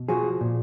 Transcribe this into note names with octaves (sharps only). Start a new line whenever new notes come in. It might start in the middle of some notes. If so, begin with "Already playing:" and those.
Already playing: B2
F3 F#4 G#4
A#2